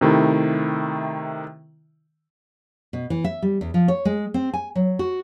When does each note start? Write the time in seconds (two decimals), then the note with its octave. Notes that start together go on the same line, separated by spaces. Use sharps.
0.01 C3 D#3 A3 E4
2.93 B2
3.10 E3
3.24 E5
3.42 G3
3.61 E2
3.74 F3
3.88 C#5
4.05 G#3
4.34 C4
4.53 G#5
4.75 F#3
4.99 F#4